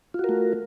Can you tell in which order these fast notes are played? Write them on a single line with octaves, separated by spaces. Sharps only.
F4 F#4 A#4 A3